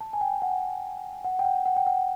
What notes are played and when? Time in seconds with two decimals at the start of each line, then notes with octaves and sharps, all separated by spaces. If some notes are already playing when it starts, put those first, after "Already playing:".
0.01 A5
0.13 G#5
0.21 G5
0.42 F#5
1.24 F#5
1.39 G5
1.45 F#5
1.66 F#5
1.77 G5
1.86 F#5